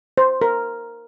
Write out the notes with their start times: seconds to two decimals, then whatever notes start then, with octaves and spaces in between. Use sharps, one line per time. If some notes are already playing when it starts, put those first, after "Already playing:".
0.18 C5
0.42 A#4